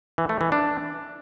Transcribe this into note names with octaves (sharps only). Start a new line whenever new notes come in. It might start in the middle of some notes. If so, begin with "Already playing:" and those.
E3
A3
E3
D4